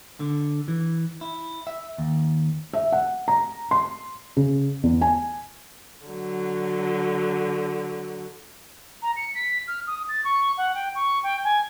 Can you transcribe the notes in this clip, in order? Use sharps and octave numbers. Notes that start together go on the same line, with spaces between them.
D3
E3
E4
E5
D#2
E5
F#5
A#5
C6
C#3
E2
G#5
D3 F#3
A#5
C#7
B6
F6
D#6
A6
C#6
F#5
G5
C#6
G5
G#5